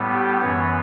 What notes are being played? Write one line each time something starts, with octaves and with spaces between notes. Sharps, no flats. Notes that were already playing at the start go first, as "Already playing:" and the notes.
Already playing: A2 G3 B3
G4
F#2 E3 B3 C#5